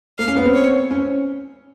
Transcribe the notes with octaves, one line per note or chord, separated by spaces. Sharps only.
A#3 F5
C#4
B3
C4
C#5
C#4